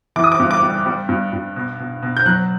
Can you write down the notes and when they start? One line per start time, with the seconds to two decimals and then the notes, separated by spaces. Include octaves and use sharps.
0.16 E3 D6
0.24 D#6
0.32 D6
0.39 G2
0.51 D6
0.63 G3
0.86 G3
1.09 G2
1.33 G2
1.56 B2
1.80 B2
2.02 B2
2.17 G6
2.26 F#3 F#6